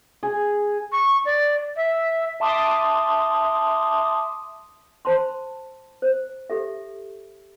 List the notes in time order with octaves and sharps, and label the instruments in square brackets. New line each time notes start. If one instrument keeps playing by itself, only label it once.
[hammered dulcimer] G#4
[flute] C#6
D5
E5
[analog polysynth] E5 A5 C6 D6 D#6
[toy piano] C5 A5 B5 C6
C5
G4 A4 E5